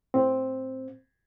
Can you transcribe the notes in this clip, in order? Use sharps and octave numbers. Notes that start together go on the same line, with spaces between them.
A2 C4